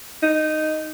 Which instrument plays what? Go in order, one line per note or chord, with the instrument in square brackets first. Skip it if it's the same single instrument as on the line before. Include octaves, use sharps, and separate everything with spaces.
[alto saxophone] D#4